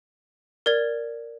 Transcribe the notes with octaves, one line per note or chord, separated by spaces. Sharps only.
A#4 D5 G#6